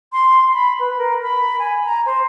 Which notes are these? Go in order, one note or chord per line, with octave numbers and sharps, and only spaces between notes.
C6
B5
B4
A#4
B5
G#5
A#5
C5